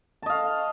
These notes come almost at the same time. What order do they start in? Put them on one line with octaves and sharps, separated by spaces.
A5 D#5 F5